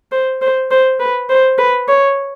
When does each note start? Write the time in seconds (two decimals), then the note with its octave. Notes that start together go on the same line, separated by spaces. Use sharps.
0.12 C5
0.42 C5
0.71 C5
1.00 B4
1.30 C5
1.58 B4
1.88 C#5